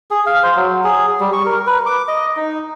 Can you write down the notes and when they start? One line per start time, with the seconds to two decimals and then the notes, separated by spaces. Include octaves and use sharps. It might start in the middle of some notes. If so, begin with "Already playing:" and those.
0.11 G#4
0.26 F5
0.43 C5
0.56 F#3
0.84 G#4
1.20 G3
1.33 C#6
1.46 A#4
1.67 B4
1.86 D6
2.08 D#5
2.37 D#4